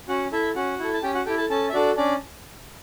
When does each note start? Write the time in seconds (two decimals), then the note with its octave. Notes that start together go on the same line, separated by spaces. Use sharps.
0.08 C#4 F#4 F#5
0.32 E4 A4 E5
0.56 C#4 F#4 F#5
0.79 E4 A4
0.94 A5
1.03 C#4 G4 G5
1.15 F#4 F#5
1.26 E4 G4 A4 G5
1.38 A4 A5
1.49 C#4 A4 A5
1.69 E5
1.74 D4 F#4 A4 D5
1.97 C#4 D4 D5